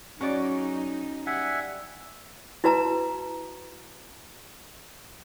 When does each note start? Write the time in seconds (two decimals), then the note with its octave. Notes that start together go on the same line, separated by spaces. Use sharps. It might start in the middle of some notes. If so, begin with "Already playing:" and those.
0.21 F#3 C#4 D#4 F#4 G#4 D5
1.26 G3 E5 F#5 G#5
2.64 E4 F#4 B4 A5 A#5